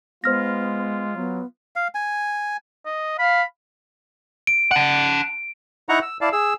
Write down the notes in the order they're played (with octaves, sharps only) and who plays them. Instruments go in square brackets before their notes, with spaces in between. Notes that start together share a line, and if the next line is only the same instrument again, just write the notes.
[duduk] G#3 [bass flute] B3 [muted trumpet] F4 [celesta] C5 F6 A#6
[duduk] F#3 [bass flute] B3
[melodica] F5
G#5
[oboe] D#5
[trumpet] F5 [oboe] B5
[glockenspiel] D7
[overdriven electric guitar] F#5 A5
[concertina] D#4 E4 F#5 A#5 C#6
E6
E4 D5 F5 A5
G#4 E6